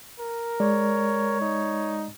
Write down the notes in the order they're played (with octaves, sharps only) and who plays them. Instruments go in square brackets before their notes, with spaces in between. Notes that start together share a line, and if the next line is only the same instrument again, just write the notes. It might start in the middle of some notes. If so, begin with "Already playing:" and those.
[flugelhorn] A#4
[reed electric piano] G#3 D5 [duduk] C#5
[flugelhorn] D#4